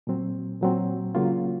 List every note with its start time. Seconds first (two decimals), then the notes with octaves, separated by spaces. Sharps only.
0.07 A#2 F#3 C4
0.61 A#2 F#3 C4
1.15 C#3 F#3 A#3 F4